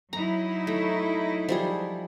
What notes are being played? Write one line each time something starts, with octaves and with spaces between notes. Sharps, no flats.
F#3 D#4 E4 A#5
A3
F3 G3 G#4